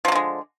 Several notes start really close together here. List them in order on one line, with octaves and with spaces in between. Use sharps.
F3 F#3 D3 G#3